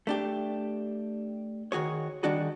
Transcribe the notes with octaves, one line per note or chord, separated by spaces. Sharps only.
A3 D4 G4
D#3 F#4 G#4 C#5
D#3 G3 D4 F#4 G#4